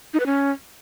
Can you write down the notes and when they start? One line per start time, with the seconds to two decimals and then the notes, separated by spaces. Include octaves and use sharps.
0.14 D#4
0.20 B4
0.26 C#4